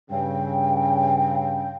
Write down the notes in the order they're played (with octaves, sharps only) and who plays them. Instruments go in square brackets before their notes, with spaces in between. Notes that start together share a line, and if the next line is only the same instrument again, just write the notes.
[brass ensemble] G2 C#3 [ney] G5